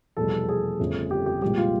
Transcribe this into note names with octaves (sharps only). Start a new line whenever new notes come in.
F1 E2 B2 G3 A4
G#4
G1 F2 C#3 F3 A3
G4
G4
C2 A#2 F3 G#3 G4
F4